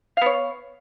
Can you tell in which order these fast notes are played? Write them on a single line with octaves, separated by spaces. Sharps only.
F5 B3 C#5